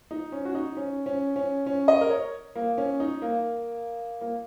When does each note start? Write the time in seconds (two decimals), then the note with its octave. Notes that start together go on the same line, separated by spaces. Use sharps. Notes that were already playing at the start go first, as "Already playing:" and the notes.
0.11 D#4
0.32 C#4
0.45 F#4
0.55 D#4
0.77 C#4
1.06 C#4
1.36 C#4
1.66 C#4
1.88 D#5
2.01 A#4
2.10 C#5
2.55 A#3
2.78 C#4
3.00 D#4
3.22 A#3
4.21 A#3